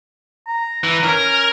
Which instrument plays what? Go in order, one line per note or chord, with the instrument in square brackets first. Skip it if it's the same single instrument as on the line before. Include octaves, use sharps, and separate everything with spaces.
[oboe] A#5
[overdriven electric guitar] E3
[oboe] C#4 [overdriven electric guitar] A#4